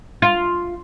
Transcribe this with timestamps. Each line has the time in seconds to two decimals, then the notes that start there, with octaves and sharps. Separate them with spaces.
0.22 F4